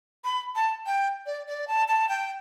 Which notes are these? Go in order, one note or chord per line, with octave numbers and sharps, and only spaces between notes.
B5
A5
G5
D5
D5
A5
A5
G5